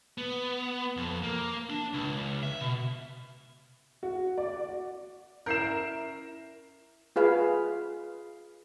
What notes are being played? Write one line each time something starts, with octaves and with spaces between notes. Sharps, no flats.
B3
F2
A#3
D4
C#2
E5
B2
F#4
D5
F#4
C#4 E4 A#4 E5 G6 C7 E7
F4 G#4 B4 F5